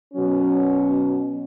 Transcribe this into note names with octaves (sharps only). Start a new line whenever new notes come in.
B2 F#3 C#4